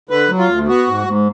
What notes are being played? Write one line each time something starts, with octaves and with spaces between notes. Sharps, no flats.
D3 B4
F#3
F4
D2
B3 F#4
G#2
G#2